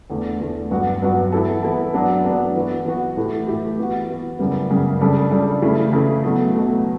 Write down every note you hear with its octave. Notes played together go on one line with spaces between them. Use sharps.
E2 D3 A3
E2 D3 A3
G2 F#3 B3 F#4
G2 F#3 B3 F#4
E3 B3 E4 A4
E3 B3 E4 A4
F#3 B3 D4
F#3 B3 D4
E3 B3 F#4
E3 B3 F#4
A2 E3 A3 E4 G4
A2 E3 A3 E4 G4
E3 B3 F#4
E3 B3 F#4
F#2 C#3 G3 B3
F#2 C#3 G3 B3
C#3 G3 D4 A4
C#3 G3 D4 A4
C#3 E3 A3 E4
C#3 E3 A3 E4
B2 F#3 A3
B2 F#3 A3